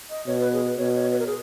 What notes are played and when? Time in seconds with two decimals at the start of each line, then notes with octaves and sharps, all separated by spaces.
0.10 D#5
0.27 B2 C#5
0.40 B4
0.53 G#4
0.66 B4
0.77 B2 C#5
0.95 C#5
1.12 B4
1.19 A#4
1.27 G#4